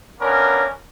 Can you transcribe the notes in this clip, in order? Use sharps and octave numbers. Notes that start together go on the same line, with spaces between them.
A#3 B3 C#4 D4 A#4